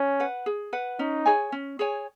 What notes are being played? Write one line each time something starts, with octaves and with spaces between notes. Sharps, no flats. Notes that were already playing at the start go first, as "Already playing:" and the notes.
Already playing: C#4
B4 F#5
G#4
B4 F#5
C#4 D#4
G#4 C#5 G#5
C#4
G#4 C#5 G#5